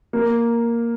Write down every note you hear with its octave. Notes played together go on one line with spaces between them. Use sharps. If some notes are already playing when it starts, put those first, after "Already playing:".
A#3